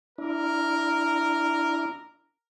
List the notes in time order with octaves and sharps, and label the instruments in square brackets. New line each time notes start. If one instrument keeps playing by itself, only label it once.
[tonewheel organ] D4 E4 [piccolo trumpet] A#4